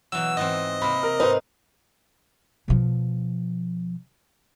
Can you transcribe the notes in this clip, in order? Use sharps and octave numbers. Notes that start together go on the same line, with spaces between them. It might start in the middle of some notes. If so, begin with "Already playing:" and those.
B2 E3 F#3 E6
G#2 E3 C4 D#5
C3 A#3 B5
A#4
G#2 D#4 B4 C5
B2 F3